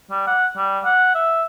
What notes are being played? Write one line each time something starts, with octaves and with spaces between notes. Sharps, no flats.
G3
F#5
G3
F#5
E5